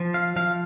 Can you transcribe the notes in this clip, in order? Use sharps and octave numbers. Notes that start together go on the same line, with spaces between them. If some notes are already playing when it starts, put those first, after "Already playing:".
Already playing: F3
F5
F3 F5